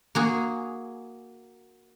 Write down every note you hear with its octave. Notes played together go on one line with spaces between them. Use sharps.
A#3 F#4 G#4